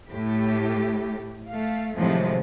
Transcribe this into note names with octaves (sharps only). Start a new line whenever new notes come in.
A2 G4
A3 F5
A2 C3 D#3 F3 F#3 G#3